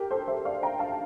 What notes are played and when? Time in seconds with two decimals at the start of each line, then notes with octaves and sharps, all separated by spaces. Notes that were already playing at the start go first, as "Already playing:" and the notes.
Already playing: G4 A#4
0.11 A4 C5
0.28 C5 E5
0.45 D5 F5
0.63 G5 A#5
0.79 F5 A5